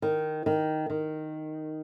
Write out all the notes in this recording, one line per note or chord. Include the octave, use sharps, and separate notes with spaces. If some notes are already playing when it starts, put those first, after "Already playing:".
D#3
D#3
D#3